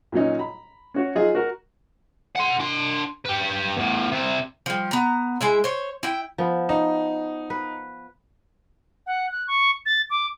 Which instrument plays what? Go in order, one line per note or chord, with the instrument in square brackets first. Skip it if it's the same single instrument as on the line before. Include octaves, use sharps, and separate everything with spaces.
[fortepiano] A#2 F#3 C#4 D#4
A#5 B5
C#4 F#4 C#5
F#3 D#4 F4 G#4 D#5
F#4 A#4
[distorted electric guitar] F#5 C6
D4 C6
G4 B4
E2 A2
C3 E4
[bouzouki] F3 G3
B3 A#5
G#3 E4 E5
C5 C#5
E4 G5
[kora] F3 B3
[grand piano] D#4
[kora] B4
[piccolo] F#5
F#6
C#6
A6
D6